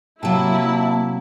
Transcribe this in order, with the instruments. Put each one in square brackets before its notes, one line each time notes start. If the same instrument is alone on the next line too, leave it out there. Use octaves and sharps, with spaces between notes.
[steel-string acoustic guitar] C3 F#3 [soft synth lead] A#3 [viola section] E4 [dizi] A5